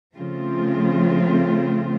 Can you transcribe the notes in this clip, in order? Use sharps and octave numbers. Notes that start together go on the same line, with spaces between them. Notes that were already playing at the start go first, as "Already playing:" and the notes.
C#3 F3 A3 C4 F4